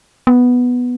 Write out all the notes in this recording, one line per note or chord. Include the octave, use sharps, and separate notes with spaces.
B3